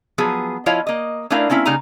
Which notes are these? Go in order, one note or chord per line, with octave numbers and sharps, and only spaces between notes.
F3 F#3 B3 G#4
F3 E4 F4 C#5 D#5 F5
A#3 D#5
A3 C#4 D4 E4 A#4 F5
A#3 C4 C#4 E4
C#3 G3 A#3 D#4 G#5 A#5